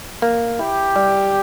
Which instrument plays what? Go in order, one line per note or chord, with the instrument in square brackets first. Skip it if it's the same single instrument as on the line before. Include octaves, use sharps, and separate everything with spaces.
[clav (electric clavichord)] A#3
[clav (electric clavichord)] E4 [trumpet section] G4
[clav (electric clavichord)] G3